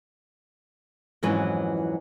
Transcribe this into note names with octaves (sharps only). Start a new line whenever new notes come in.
F2 G#2 E3 F#3 C#4 B4